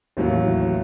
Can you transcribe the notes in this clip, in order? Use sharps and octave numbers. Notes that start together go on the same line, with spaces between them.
A1 D#2 A2 F#3